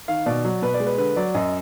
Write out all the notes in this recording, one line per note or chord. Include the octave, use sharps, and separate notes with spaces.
D#3 F5
B2 D5
F#3
B2 B4
D5
G#3
B4
D3 B4
F#3 D5
F#2 D#5